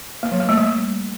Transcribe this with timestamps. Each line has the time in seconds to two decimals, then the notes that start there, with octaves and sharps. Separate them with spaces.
0.23 A#3
0.32 F#3
0.40 A#3
0.49 A3
0.57 G3